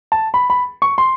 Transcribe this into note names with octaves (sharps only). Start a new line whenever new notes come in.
A5
B5
B5
C#6
C6